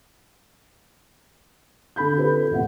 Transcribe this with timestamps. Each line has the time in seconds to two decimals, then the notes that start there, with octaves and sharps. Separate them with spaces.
1.96 D3 A4 B5 G6
2.16 C4 F4 G4 A4 B4 C5
2.51 E2 A2 C3 F4 E5 F#5